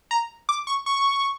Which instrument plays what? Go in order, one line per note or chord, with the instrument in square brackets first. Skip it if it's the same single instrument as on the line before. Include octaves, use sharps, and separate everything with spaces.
[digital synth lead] A#5
D6
C#6
C#6